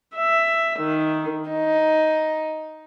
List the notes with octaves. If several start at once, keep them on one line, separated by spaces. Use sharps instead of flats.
E5
D#3
D#4